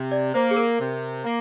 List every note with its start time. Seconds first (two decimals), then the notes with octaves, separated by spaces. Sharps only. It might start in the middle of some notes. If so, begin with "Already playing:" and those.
Already playing: C3
0.12 D5
0.34 A#3 C5
0.51 G#4
0.56 A#4
0.80 C3
1.25 A#3